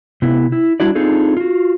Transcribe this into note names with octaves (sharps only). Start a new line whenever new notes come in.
C3 B3 E4
E4
G3 D4 E4 F#4 D5
C4 D4 D#4 F4 G#4 A4
F4 F#4